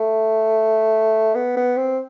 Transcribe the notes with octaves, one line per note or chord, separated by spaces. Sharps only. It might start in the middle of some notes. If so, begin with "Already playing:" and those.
Already playing: A3
B3
B3
C4